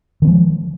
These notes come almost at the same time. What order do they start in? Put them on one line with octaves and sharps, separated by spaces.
D#3 C4 F3 G#3